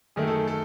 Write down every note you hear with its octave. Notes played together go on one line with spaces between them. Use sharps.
F#2 D#3 A3 G#4
A4
A4